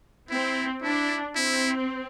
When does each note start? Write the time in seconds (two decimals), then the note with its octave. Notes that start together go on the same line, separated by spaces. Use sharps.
0.30 C4 E4
0.82 D4 E4
1.35 C4 E4